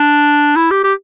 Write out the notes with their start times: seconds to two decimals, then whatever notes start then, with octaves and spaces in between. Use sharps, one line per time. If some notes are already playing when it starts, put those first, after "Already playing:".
Already playing: D4
0.56 E4
0.71 G4
0.84 G4